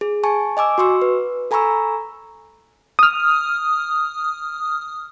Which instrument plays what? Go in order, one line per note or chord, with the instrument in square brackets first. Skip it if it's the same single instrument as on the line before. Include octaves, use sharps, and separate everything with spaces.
[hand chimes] G#4
G#5 A5 C#6
D#5 G#5 D6 E6
F#4 C6 C#6 E6
B4
A4 G#5 A#5 B5 C#6 E6
[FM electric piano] D#6 F6